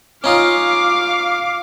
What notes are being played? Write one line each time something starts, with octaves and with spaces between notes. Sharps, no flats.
C#4 D#4 F4 F5 D6